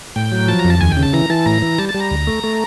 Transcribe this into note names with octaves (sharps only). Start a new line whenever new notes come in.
A2 G5
F#3
F3 A5
A#5
F2
A5
D#2 G#5
G5
C#3
A5
E3 A#5
E3 A5
A2 A#5
E3
G3 A5
A5
G3
A#5
D2
A3
A3